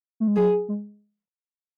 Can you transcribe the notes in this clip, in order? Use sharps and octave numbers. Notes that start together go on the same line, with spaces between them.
A3
G#3
F#3 G#4
G#3